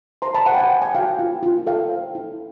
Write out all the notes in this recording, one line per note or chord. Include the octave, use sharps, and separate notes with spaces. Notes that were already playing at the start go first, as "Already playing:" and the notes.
C5 A#5 C6
A5 B5
C5 F#5 G#5
G5
F#5 G#5
C5 G5
G#5
F#4 F5 G5
F4
F4
A4 F5 G5
C5
E4